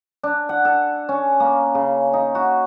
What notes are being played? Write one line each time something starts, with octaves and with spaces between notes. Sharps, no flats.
D4
F#5
A4
C#4
A#3
C#3
D#4
F#4